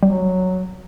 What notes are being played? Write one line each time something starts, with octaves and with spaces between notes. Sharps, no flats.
F#3 G3